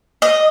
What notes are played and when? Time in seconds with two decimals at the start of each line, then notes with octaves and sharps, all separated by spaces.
0.22 D#5